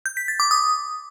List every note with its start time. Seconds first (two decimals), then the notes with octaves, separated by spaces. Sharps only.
0.06 G6
0.17 B6
0.28 A6
0.40 D6
0.51 D#6